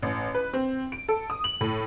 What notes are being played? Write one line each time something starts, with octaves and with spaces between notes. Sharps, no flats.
A1
B4
C4
D7
A4
D#6
F#7
A2